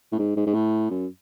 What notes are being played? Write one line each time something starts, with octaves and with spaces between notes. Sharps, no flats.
A2
G#2
G#2
G#2
A2
F#2